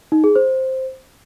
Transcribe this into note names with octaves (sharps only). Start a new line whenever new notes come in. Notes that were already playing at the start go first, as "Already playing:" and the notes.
D#4
G#4
C5